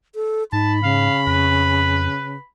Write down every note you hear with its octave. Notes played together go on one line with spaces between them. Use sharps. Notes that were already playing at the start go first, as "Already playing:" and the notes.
A4
G#2 D#4 A5 B5
C#3 F5
F2 B4